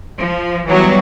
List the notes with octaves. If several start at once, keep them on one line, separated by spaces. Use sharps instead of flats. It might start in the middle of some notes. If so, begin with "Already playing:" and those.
F3
E3 F#3 G3 B3 F#4